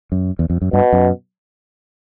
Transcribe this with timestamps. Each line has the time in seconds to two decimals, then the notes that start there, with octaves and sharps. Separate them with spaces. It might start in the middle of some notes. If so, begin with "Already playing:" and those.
0.12 F#2
0.39 E2
0.50 F2
0.62 F#2
0.73 G2 B2
0.93 F#2